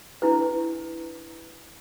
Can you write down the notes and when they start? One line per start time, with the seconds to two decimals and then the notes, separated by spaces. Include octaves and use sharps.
0.22 D4 E4 B4